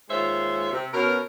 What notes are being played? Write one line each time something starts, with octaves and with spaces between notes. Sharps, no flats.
D#2 G#3 F4 C5 C#5 E5
C3
B2 C#4 A#4